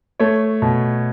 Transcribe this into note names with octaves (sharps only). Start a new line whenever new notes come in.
A3 C#5
B2